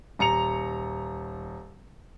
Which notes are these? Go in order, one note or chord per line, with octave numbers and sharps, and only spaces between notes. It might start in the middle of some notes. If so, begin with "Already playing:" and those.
D#1 A#5 C#7 F7